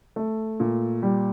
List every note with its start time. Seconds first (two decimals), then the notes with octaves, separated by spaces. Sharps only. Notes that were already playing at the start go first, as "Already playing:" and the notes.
0.16 A3
0.60 A#2
1.03 G3